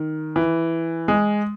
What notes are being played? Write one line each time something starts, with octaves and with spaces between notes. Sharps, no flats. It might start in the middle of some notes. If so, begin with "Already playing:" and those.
Already playing: D#3
E3
G#3